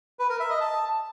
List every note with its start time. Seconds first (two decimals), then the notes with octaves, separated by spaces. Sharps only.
0.19 B4
0.29 A#4
0.40 E5
0.50 D#5
0.60 A5